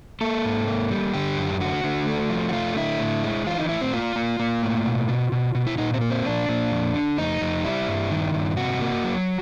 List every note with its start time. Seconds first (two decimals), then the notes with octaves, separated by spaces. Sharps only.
0.21 A#3 A4
0.45 G#2
0.67 A#3
0.91 G3
1.13 D3 G4
1.37 F#2
1.61 D3 F#4
1.84 D3
2.07 A3
2.29 F3
2.49 F#4
2.53 A3 F4
2.76 D3 E4
2.99 A2
3.24 G#3
3.46 E3 F4
3.58 D#4
3.69 A2 E4
3.81 C4
3.93 A#3 F4
4.16 A#3
4.39 A#3
4.63 A2
4.86 B2
5.09 B2
5.32 B2
5.55 B2
5.67 E4
5.78 A#2 D#4
5.94 C4
6.01 A#3
6.10 C4
6.25 A#2 D4
6.49 A#2
6.72 F2
6.94 D3
7.18 F2 D#4
7.41 F2
7.64 G3 E4
7.88 G2
8.11 D#3
8.35 G2
8.57 C3 F#4
8.81 A#3
9.04 F#3